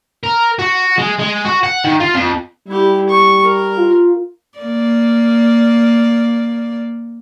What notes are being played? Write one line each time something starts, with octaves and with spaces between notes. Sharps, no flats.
A#4
F#4
G#3
G#3
F#4
F#5
D#3
F4
F2
G3 E4 G4
C#6
A#4
F4
A#3 D5